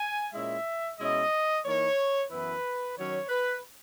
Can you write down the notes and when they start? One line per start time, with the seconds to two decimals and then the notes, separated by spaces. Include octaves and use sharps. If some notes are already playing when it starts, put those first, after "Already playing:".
Already playing: G#5
0.33 A#2 G#3 C#4 E4 E5
0.99 B2 G#3 C#4 E4 D#5
1.65 E3 A#3 D#4 C#5
2.31 F#2 E3 B3 E4 B4
2.96 D#3 F#3 C#4 C#5
3.28 B4